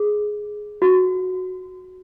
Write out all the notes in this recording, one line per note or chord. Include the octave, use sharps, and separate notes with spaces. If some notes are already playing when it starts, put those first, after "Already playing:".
Already playing: G#4
F#4